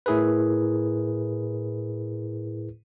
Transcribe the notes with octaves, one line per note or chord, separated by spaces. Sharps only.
A2 E4 G#4 A#4 B4